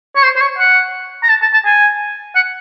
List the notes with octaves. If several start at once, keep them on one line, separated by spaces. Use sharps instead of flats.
C#5
C5
C5
C#5
F#5
A#5
A5
A5
A5
G#5
F#5